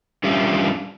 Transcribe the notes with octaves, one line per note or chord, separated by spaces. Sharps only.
G3 C#4 D4 F4 G4 E5